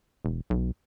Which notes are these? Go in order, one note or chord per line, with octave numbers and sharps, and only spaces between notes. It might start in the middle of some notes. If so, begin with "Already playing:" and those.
E1
B1